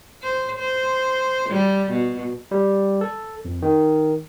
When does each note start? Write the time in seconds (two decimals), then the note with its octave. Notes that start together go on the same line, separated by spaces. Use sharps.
0.23 C5
0.59 C5
1.50 G3
1.91 B2
2.51 G3
3.01 A4
3.45 F2
3.62 D#3